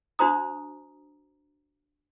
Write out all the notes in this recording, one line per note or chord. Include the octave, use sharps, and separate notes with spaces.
D4 F#4 C5 A#5 D#6